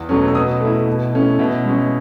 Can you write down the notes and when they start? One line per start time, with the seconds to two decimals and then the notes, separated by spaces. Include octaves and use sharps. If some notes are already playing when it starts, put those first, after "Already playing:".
Already playing: E2
0.09 B2 F#3 A3 C#4
0.28 E6
0.35 B2 D#6
0.61 A3 E4
0.87 B2
1.13 A3 C#4 E4
1.39 B2 E5
1.66 G#3 C#4